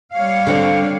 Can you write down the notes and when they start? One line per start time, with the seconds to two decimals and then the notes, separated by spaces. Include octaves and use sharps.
0.14 G3 C#5 F5
0.47 D3 C4 D4